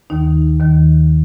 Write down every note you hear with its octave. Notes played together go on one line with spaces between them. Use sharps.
D#2 D#3 D#4
D#2 D#3